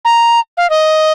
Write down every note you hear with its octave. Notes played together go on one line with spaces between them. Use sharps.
A#5
F5
D#5